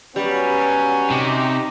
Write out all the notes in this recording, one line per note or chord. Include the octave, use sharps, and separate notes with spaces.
F#3 G3 B3 C#4 B4
C3 D#4 G4